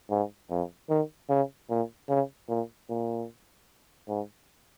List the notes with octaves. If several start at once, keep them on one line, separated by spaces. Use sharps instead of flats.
G#2
F2
D#3
C#3
A#2
C#3
A#2
A#2
G#2